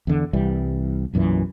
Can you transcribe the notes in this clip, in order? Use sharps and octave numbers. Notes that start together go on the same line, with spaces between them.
E2 D3
C2 E3 G3
B1 F#2 A#2 E3